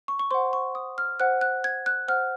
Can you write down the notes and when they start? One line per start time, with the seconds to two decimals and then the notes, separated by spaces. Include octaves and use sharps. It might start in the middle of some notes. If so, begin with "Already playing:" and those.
0.08 C#6
0.19 C#6
0.31 C5 F#5 C6
0.53 C#6
0.75 D#6
0.98 F6
1.20 C5 F#5 F#6
1.41 F#6
1.64 G#6
1.86 F#6
2.08 C5 F#5 F6